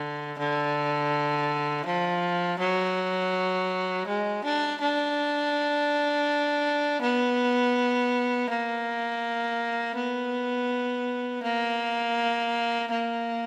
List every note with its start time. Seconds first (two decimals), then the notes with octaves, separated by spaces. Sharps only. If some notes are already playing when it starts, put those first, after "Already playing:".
Already playing: D3
0.38 D3
1.86 F3
2.59 F#3
4.07 G#3
4.44 D4
4.81 D4
7.01 B3
8.49 A#3
9.96 B3
11.43 A#3
12.91 A#3